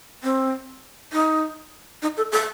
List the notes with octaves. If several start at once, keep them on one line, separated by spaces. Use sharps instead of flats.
C4
D#4
D#4
A4
A4